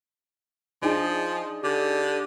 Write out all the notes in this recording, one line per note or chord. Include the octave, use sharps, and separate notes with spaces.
F3 D4 D#4 G#4
D3 G4